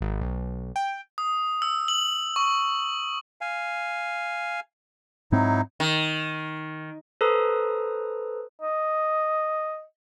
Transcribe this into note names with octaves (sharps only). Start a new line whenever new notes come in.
G#1
B1
G5
D#6
E6
F#7
C#6
F5 G#5
G#2 F#3 C4 D#4 E4
D#3
A4 B4 C5 A#5 D#6
D#5